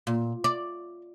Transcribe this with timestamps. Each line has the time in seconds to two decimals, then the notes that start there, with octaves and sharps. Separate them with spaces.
0.07 A#2
0.44 D5